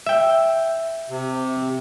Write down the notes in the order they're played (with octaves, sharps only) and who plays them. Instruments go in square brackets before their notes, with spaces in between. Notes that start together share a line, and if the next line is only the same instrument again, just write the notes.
[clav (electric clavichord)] E5 G5
[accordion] C3